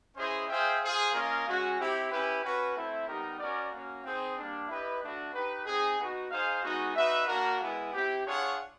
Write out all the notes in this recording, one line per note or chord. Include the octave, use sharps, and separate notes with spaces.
C#4 E4 G#4 C5 D#5
F4 G#4 C5 E5 G5
F4 G#4 C5
A#3 C#4 F4 A#4 D#5
G#3 C#4 F#4
C4 E4 G4
C#4 E4 G4 B4
C#4 F#4 B4
A3 C4 E4
G3 B3 D#4 G4 A#4
C#4 F#4 A#4 D5
A#3 C#4 F#4
C4 D#4 G#4 C5
G3 A#3 D4
E4 G4 B4 D#5
A3 D4 F#4
D#4 G4 B4
C4 D#4 G#4
B3 D#4 F#4
D#4 G#4 C5 F5
G#3 B3 D#4 F#4
D#4 F#4 B4 E5
A#3 D4 F#4 A#4
G#3 B3 E4
C4 E4 G4
D4 F4 G#4 C#5 F#5